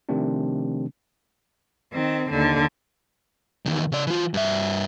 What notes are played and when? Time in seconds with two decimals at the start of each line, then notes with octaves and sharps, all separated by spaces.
0.09 C3 D#3 F3 A3 C4 D4
1.93 D#3 C4
2.30 D#2 D3
3.66 E2 D#3
3.92 C#3 D5
4.07 E3 F4
4.34 G2 E5